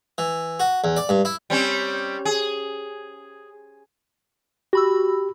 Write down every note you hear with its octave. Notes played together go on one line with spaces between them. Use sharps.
E3
F#4
E2
D5
G2
E4
G3 C4 C#4
G#4
F#4 G4 B5 E6